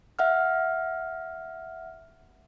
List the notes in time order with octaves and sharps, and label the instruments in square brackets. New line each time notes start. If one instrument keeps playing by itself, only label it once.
[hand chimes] E5 F#5 F6